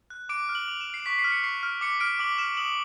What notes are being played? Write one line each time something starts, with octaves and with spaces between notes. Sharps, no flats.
F#6
D6 D7
F6
F#7
D6 F7
E7
F6
C7
C#6 B6
C7
F6
C#7
C#6 C7
F6
D6 C#7
F6 D7
D6 F#7
F6 E7
D#6 F#7